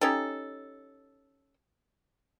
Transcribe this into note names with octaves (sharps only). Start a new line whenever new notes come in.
C#4 D#4 G4 A4